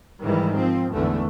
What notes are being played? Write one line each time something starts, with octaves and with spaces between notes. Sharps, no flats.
G#2 D#3 E3 G3
F3 C4
G#1 E2 D3 A3